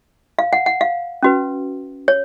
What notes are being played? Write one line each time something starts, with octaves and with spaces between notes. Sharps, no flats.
F5
F#5
F#5
F5
C#4 F#4 B4
C#5